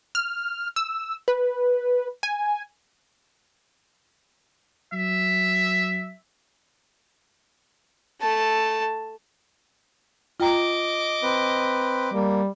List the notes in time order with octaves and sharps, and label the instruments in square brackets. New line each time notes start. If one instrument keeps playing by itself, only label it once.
[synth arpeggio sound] F6
E6
B4
G#5
[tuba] F#3 [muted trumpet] E5
[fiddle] A3 A5
[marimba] F4 G5 A#5 [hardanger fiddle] D#5 D6
[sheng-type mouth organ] C4 B4
[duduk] G3 [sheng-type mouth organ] A#3